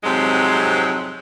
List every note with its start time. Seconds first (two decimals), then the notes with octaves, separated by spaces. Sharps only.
0.04 F2 G#2 C3 F#3 G#3 C4